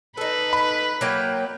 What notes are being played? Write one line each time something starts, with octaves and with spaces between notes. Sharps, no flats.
D#4 A4 B4
B5
F#3 A#3 G5